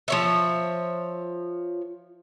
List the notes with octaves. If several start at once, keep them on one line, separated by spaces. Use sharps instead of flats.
F3 C#5 E5